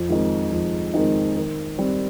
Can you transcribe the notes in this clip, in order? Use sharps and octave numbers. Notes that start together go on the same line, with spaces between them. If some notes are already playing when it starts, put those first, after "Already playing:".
Already playing: F2
D#3 G#3 C4 D#4
F2
D#3 G#3 C4 D#4
D#3
G3 C4